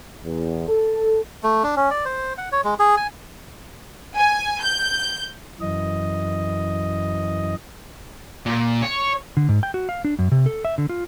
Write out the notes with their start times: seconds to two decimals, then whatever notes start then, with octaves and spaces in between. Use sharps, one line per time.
0.24 E2
0.68 A4
1.43 A3
1.63 D4
1.76 C#4
1.90 D5
2.05 C5
2.38 F#5
2.52 C#5
2.64 G#3
2.79 G#4
2.97 G#5
4.17 G#5
4.61 G6
5.60 F#2 E3 D#5
8.46 A#2
8.82 C#5
9.37 D3
9.49 G#2
9.63 G5
9.74 F#4
9.89 F5
10.05 D4
10.19 F#2
10.32 C3
10.46 A4
10.65 E5
10.78 D3
10.89 F4